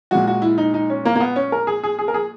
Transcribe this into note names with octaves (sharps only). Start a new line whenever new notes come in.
A#2 G#3 F#4
F#4
E4
D#4
D#4
C#4
A#3
A#3
B3
C#4
A#4
G#4
G#4
G#4
A#4
G#4